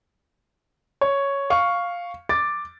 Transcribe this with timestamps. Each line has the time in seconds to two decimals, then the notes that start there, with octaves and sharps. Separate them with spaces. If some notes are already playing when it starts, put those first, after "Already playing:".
1.01 C#5
1.50 F5 C#6
2.29 D6 A6